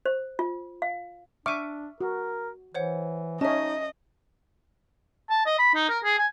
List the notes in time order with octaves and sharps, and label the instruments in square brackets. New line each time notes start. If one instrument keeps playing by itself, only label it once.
[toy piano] C5
F4
F5
[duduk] D4 [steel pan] E5 C#6 D6 [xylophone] F6 D#7
[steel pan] F#4 [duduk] A#4
[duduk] E3 [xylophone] C5 C#5 F#5
[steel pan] C#4 C#5 [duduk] D#4 [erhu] D#5 [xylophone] E5 A5
[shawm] A5
D#5
B5
D#4
A#4
G#4
G#5